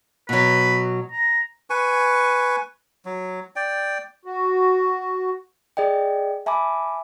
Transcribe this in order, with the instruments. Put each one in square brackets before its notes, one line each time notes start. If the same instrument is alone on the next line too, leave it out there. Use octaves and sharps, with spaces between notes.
[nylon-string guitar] B2 F#3 [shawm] B4
[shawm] A#5
[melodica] B4 G#5 C#6
F#3
D5 G5
[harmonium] F#4
[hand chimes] G#4 D5 D#5 G5
E5 G#5 A5 B5 D6